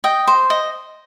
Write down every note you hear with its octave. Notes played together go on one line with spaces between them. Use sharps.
D#5 G5
C5
D#5